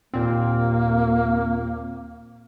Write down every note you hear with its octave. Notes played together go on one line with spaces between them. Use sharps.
D#2 A#2 A#3 C4